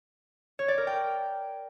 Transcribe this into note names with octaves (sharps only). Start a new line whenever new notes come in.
C#5
D5
A#4
G5